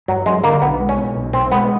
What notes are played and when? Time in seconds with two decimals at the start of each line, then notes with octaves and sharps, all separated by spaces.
0.08 G2 F#3
0.26 F#3 G#3
0.44 D3 A#3
0.62 B1 B3
0.80 G#3
0.89 C#4
0.97 B2
1.16 B1
1.33 B2 C4
1.52 G#3 B3